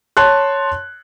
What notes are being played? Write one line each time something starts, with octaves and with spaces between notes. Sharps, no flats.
C#5 A5 C6 F#6